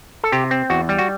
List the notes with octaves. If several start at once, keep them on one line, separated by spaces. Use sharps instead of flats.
A4
C3 G4
C4
E2 F#4
G3
F#4